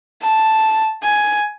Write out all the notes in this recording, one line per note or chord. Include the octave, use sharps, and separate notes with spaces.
A5
G#5